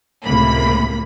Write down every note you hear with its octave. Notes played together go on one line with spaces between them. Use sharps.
C#2 A2 C3 A#3 B5